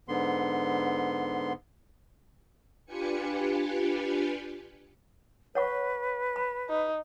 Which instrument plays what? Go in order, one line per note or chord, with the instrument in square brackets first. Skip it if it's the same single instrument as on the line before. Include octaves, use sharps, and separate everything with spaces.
[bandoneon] G#2 D3 B3 C6
[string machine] D4 F4 G4 B4 G#5 C#7
[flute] B4 [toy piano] C#5 F#5 C#6
[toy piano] B5
[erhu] D#4